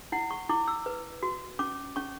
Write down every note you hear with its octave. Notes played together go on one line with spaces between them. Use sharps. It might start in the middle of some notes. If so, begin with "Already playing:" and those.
E4 F#5
C#6
E4 D6
E6
B4
F#4
C#4 D6
C#4 C#6